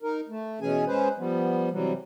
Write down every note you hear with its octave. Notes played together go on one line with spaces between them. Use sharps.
D#4 A#4
A3
B2 E3 C#4 G#4 G#5
G#3 C#4 G#4 B4 C5
F3 G3 B3
C3 E3 F#3 G3